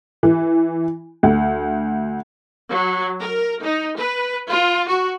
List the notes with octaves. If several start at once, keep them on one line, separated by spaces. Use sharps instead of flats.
E3
D2
F#3
A#4
D#4
B4
F4
F#4